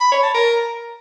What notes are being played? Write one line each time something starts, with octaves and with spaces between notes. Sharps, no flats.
B5
C#5
A5
A#4